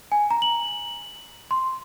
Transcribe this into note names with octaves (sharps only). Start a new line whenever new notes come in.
G#5
A#5
F#7
C6